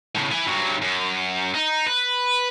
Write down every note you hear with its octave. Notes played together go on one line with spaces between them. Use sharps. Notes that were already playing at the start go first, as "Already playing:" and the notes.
A2 C#3
E4 G#5
G2 F#3
F#2
D#4
B4